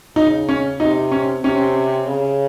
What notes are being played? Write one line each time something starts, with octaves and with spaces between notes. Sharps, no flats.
C#3 D#4
C#4
C3 D#4
C#4
C3 C#4
C#3